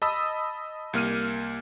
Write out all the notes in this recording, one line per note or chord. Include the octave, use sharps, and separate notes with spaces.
D#5 A5 B5 D#6 E6
C2 A#3 F6 D#7